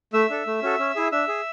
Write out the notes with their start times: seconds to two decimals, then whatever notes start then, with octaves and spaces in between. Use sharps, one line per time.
0.13 A3 E5 E6
0.30 D4 A4
0.47 A3
0.62 C#4 F#4 A4
0.79 C#4
0.96 E4 G#4
1.12 D4 E5 E6
1.28 G#4